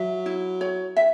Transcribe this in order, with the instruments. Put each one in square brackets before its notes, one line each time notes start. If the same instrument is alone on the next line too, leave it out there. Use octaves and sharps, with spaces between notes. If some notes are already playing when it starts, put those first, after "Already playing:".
Already playing: [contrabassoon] F#3 [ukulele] E5
[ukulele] E4
C#5
E5